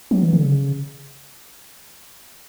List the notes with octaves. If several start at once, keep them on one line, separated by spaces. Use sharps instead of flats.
F#3
E3
D3
C#3